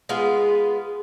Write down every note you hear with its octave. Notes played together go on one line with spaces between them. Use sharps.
G#3 B3 F4 G#4